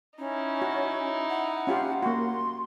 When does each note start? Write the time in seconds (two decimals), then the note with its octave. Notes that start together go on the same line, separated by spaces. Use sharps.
0.18 C#4 D#4 E4
0.62 F#4
1.30 F#5
1.67 C#4 F4 G4
2.03 A#3 F#4 C6